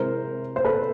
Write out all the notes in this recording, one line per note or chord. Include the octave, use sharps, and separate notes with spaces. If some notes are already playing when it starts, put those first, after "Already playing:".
Already playing: C3 E3 G#3 A#4 C5
C5
A4 B4